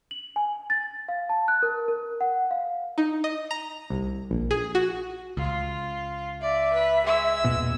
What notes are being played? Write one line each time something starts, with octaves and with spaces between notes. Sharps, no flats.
F#7
G#5
A6
F5
A5
F#6
A#4
A#4
F#5
F5
D#4
D#5
A#5
C2
A#1
G#4
F#4
C#2 F4
D5 E5
B4 B5
G#3 E6
E1 A#2 B3